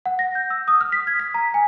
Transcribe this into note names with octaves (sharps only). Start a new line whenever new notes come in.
F#5
A#6
G6
E6
D#6
F6
B6
G#6
B6
A#5
G#5